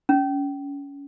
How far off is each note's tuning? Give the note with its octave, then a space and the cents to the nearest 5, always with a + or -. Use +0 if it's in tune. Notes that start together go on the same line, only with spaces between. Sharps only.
C#4 +25